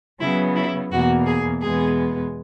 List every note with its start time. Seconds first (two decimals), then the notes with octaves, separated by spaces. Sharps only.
0.20 C#3 F#3 B3 E4
0.56 E4
0.91 E2 B2 A#3 F#4
1.26 G#4
1.62 E2 B2 G#3 B3 G#4